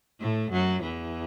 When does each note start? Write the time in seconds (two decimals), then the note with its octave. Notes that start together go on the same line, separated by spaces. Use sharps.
0.20 A2 A3
0.52 F#2 F#3
0.83 E2 E3